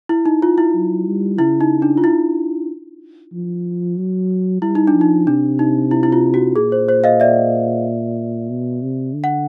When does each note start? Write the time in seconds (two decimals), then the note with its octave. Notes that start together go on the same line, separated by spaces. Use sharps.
0.09 E4
0.26 D#4
0.42 F4
0.58 E4
0.74 F#3
1.07 G3
1.39 C#3 E4
1.61 D#4
1.82 D4
1.97 F4
2.04 E4
3.33 F3
3.97 F#3
4.62 G3 E4
4.75 D#4
4.87 D4
4.94 F3
5.01 D#4
5.27 C3 D4
5.59 D#4
5.91 E4
6.03 E4
6.12 F4
6.34 F#4
6.56 A#2 G#4
6.72 C5
6.89 C5
7.04 D#5 F5
7.20 D5 E5
8.50 B2
8.82 C3
9.14 D3
9.24 F#5